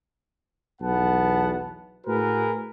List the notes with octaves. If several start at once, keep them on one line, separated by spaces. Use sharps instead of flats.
B1 E2 B3 F#5 A5
A2 F#4 G#4 A#4 B4